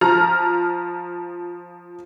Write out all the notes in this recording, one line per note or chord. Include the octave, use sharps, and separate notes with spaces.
F3 A#5 F6